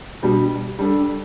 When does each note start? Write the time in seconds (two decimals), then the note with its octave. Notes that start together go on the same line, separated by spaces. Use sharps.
0.22 B2 G3 D4
0.79 G3 D4 A4